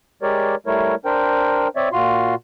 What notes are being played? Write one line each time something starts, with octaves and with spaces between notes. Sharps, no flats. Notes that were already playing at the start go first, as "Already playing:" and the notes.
G#3 G4 A#4 C#5 D5
G3 A3 E4 A#4 C#5
D4 A#4 C5 G5
C4 C#5 D5 E5
A#2 F4 F#4 C6